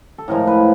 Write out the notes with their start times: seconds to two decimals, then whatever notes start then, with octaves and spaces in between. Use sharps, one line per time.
0.18 A4
0.28 A2 F3 G#3 A#4
0.47 B4